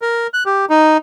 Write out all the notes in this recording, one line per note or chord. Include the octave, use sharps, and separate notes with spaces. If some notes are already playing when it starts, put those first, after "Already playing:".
A#4
F#6
G4
D#4